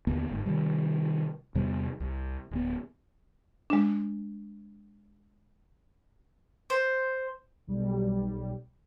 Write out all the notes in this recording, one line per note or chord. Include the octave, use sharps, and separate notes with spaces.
D#2 D3 A#3 B3
G1 G#2
C3 D#3 G3
E2 C3 G3 B3
C2
D1 B3
G#3 D4
C5
B1 G3